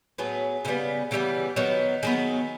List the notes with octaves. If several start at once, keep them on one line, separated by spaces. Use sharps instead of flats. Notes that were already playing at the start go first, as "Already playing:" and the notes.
A2 F#3 B3 G#4
C#3 E3 G3 B3
C#3 E3 G3 B3
D#3 F#3 B3
D#3 F#3 B3 G#4